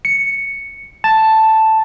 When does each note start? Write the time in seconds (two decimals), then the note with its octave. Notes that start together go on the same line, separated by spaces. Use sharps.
0.05 C#7
1.04 A5